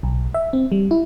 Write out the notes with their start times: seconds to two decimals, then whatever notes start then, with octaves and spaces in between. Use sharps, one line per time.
0.03 B1
0.34 E5
0.53 C4
0.72 G3
0.91 E4